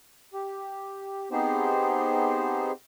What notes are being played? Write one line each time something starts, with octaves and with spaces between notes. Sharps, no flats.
G4
B3 C4 D#4 G4 G#4 C5